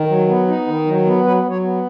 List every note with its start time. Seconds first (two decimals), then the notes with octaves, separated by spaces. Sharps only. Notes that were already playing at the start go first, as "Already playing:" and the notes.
Already playing: D#3
0.09 F#3
0.28 B3
0.48 D#4
0.67 D#3
0.86 F#3
1.06 B3
1.24 F#3 B4
1.44 F#3
1.50 C#5
1.64 B3